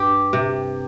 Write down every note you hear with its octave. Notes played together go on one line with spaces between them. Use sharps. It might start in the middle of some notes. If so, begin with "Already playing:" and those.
Already playing: G2 G4
C3